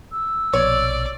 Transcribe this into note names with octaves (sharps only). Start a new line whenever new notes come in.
E6
A#1 B2 C#5 D5